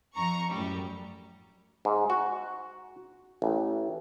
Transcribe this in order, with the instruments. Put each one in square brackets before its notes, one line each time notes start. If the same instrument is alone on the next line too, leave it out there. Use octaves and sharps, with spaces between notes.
[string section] F2 A#5 C#6
F#2 A2 G3
[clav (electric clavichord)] G#2
F#4
A1